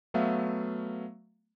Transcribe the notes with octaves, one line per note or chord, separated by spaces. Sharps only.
F#3 A3 B3 E5 F5